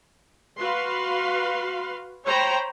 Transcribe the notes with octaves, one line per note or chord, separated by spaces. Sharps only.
F#4 B4 F5 C6
C5 C#5 G5 A#5 B5